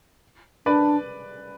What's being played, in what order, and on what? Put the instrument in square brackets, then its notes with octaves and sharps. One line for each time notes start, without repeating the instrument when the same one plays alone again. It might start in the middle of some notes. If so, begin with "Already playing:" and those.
[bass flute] D4 [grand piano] B4 D5